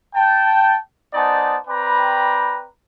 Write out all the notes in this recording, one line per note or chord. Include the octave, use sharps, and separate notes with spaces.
G5 A5
B3 D#4 C5 D5 G#5 A5
C4 B4 D5 G5 A#5 B5